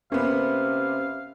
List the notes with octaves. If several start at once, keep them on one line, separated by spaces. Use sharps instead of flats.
C3 A#3 B3 C#4 F5